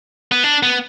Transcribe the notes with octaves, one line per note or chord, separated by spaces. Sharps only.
B3
D4
B3